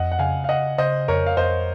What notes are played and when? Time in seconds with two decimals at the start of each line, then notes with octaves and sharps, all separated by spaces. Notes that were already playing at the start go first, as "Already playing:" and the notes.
Already playing: F2 D#5 F#5
0.12 F#5
0.19 C#3 F5 G#5
0.44 F5
0.49 C#3 D#5 F#5
0.78 C#3 C5 D#5
1.08 F2 A#4 C#5
1.26 F5
1.37 F2 C5 D#5